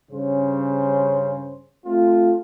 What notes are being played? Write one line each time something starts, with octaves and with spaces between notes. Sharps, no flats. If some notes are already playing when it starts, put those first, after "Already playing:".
G2 C#3 C#4 C5
A3 C4 F4